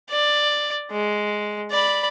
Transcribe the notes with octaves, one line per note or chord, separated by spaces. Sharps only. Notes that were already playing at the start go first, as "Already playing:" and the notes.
D5
G#3
D5 B5